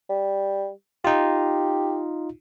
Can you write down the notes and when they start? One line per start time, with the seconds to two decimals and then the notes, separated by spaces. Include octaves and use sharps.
0.09 G3
1.05 D#4 F4 G4